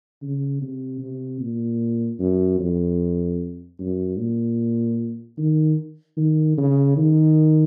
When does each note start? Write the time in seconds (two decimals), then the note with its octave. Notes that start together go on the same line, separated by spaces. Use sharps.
0.22 C#3
0.62 C3
1.01 C3
1.40 A#2
2.20 F#2
2.59 F2
3.79 F#2
4.19 A#2
5.38 D#3
6.17 D#3
6.57 C#3
6.97 D#3